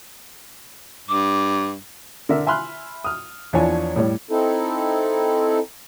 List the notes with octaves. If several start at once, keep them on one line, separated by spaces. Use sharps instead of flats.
G2 D6
D3 A#4 E5
E5 G#5 B5 C6 F6 F#6
D#6 F6
E2 F3 D4 E4 C#5 G#5
A2 G3 C#5
C4 D#4 E4 A4